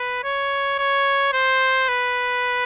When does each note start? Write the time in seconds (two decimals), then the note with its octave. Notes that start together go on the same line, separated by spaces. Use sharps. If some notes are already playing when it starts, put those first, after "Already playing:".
Already playing: B4
0.24 C#5
0.79 C#5
1.33 C5
1.88 B4